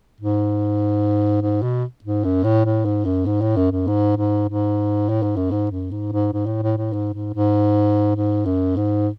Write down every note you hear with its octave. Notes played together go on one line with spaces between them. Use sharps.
G#2
G#2
B2
G#2
F#2
A2
A2
G#2
F#2
G#2
A2
F#2
F#2
G#2
G#2
G#2
A2
G#2
F#2
G#2
F#2
G#2
G#2
G#2
A2
A2
A2
G#2
G#2
G#2
G#2
F#2
G#2